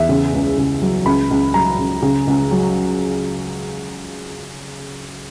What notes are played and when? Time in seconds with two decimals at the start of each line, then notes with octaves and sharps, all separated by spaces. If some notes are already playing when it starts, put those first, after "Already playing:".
Already playing: E2 E5
0.09 C#3
0.33 C#2
0.58 C#3
0.82 F#3
1.06 C#2 B5
1.31 C#2
1.54 F#3 A#5
1.79 C#2
2.02 C#3
2.27 C#2
2.51 F#3